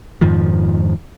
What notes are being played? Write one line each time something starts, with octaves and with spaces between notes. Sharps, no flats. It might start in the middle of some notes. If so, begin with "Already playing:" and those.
F2 G#2 D#3 F3